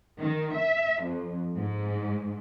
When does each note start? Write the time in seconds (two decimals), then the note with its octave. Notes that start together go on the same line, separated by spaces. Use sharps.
0.19 D#3
0.55 E5
1.03 F2
1.56 G#2